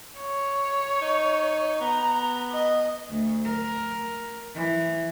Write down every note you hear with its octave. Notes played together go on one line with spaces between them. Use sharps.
C#5
D#4
B3 A#5
D#5
D2
A#4
E3